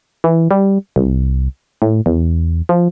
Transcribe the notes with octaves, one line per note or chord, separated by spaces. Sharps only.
E3
G3
C2
A2
E2
F3